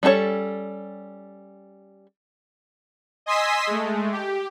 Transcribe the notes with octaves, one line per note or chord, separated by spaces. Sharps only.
G3 C#4 D4 A4 C#5
D#5 G#5 C6 D#6 E6 B6
G#3 A3
G4